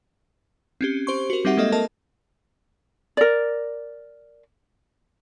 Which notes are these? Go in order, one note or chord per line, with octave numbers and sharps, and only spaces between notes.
C4 C#4 G4
G4 C5 C6 C#6
F#4 A#4
G3 C4 D#4 G4 E5 F#5
G#3 A#3 A4 D#5 E5
A#3 A4 A#4 D#5 A5
A#4 D5